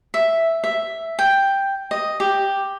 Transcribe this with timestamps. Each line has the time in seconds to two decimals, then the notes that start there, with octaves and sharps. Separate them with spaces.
0.14 E5
0.64 E5
1.19 G5
1.91 D#5
2.20 G4